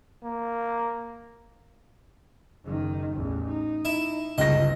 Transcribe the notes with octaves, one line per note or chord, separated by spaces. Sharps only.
A#3
F#1 D#3
A1 E2
D#4
E4 E5
G1 C#2 D#5 A#6